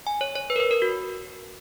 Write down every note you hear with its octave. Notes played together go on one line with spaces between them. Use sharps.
G#5
C#5
C#5
B4
A#4
B4
A#4
F#4